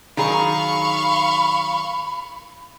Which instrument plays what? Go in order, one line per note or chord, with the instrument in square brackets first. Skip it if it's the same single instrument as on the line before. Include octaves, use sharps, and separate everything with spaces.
[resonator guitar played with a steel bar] D#3 F#3 G#4 [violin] F5 C#6 [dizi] B5